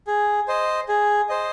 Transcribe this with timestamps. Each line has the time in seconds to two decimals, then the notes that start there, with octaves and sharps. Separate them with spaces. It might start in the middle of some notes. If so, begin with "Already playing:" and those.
0.07 G#4
0.48 C5 D#5
0.89 G#4
1.29 C5 D#5